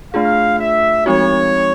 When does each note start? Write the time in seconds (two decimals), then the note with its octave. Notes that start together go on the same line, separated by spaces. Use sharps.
0.13 A3 D4 F4 G#4 F5
0.60 E5
1.06 F3 G#3 C4 D#4 F#4 C#5